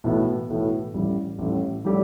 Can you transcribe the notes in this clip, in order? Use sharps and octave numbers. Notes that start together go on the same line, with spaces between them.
B1 A2 E3 B3
B1 A2 E3 B3
A1 A2 G3
A1 A2 G3
A2 G3 E4 G4 D5